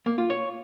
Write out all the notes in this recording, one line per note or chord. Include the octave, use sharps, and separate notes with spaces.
A#3
F4
C#5